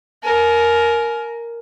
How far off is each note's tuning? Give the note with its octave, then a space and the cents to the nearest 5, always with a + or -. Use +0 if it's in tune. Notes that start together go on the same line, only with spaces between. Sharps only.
A#4 +0 G#5 +35